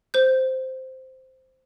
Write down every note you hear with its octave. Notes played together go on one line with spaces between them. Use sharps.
C5 G6